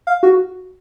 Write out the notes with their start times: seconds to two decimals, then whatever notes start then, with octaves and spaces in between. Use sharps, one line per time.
0.07 F5
0.23 F#4